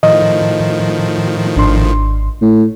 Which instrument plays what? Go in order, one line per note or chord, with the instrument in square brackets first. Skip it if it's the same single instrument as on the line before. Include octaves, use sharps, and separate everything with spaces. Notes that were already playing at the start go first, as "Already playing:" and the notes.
[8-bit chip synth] A2 D#3 F3 [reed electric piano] D#5
[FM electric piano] G#1 D4 C6
[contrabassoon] A2